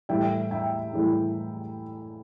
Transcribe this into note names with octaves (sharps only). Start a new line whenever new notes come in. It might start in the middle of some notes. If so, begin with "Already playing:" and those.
A2 E3 G3 E5 G5
E5 G5
A2 E3 G3